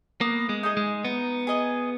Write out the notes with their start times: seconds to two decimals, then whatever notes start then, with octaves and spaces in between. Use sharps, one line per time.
0.21 A#3 B3
0.49 G#3
0.63 D#4 G#4 D#5
0.77 G#3
1.05 B3 D#4
1.47 G#4 D#5